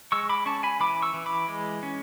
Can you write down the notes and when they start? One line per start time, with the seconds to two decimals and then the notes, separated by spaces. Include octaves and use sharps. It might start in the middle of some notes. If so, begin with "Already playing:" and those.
0.12 G#3 C#6 E6
0.29 B5 D6
0.46 C#4 A5 C#6
0.63 G#5 B5
0.80 E3 B5 D6
1.02 C#6 E6
1.14 E3
1.26 B5 D6
1.48 G#3
1.83 C#4